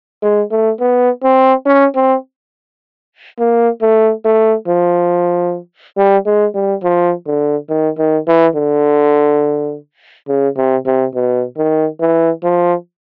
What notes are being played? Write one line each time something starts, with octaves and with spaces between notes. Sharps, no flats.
G#3
A3
B3
C4
C#4
C4
A#3
A3
A3
F3
G3
G#3
G3
F3
D3
D#3
D#3
E3
D3
C#3
C3
C3
B2
D#3
E3
F3